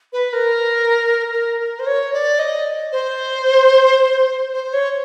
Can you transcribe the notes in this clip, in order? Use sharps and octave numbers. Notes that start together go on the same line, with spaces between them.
B4
A#4
A#4
A#4
C5
C#5
D5
D#5
C5
C5
C#5